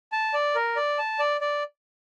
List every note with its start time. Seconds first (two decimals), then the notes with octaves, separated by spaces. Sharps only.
0.12 A5
0.34 D5
0.55 A#4
0.76 D5
0.98 A5
1.19 D5
1.41 D5